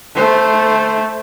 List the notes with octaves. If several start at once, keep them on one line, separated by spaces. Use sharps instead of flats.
A3 C5